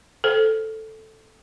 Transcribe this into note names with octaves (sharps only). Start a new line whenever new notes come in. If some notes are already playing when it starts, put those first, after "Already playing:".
A4 C5